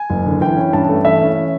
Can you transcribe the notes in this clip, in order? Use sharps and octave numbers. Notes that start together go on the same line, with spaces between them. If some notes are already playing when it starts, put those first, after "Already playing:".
Already playing: G#5
F#1
D3
E3 G5
C#4
G2 A5
A3
E3 E5
C#4